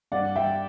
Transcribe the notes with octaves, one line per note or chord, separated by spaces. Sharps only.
G2 D5 F#5
G3 E5 G5